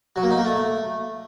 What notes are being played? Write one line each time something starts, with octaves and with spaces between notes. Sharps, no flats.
F#3
A#3
D#4
A#3
A3